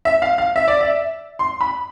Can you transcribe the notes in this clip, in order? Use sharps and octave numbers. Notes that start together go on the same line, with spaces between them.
E5
F5
F5
E5
D5
E5
C6
B5